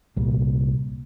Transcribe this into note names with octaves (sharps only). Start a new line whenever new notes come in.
C2 A#2 G3